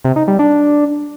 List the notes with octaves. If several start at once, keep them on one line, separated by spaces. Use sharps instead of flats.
C3
D#4
G3
D4